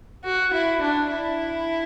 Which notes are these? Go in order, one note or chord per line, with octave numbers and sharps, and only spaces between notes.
F#4
E4
D4
E4